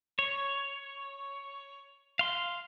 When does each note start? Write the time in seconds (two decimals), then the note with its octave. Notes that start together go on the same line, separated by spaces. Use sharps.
0.19 C#5
2.19 F5 C6